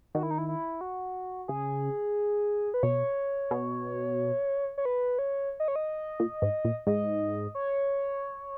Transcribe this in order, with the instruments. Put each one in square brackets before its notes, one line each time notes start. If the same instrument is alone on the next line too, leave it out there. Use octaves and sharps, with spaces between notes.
[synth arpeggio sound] D#3 [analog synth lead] F#4
[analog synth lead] E4
D#4
E4
E4
F#4
[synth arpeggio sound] C#3 [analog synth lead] G#4
[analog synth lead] B4
[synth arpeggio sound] B2 [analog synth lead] C#5
[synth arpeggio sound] B2
[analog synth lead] C#5
B4
C#5
D#5
C#5
D#5
[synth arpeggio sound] A#2
G#2
A#2
[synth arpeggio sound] G#2 [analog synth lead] D#5
[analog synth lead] C#5